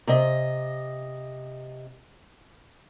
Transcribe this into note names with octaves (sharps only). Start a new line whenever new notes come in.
C3 D#5